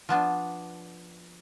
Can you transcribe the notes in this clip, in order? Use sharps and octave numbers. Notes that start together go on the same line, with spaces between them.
F3 B3 D4